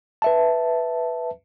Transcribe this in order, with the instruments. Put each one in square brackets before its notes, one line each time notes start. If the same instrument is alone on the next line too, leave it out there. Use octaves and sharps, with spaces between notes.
[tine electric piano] B4 E5 A5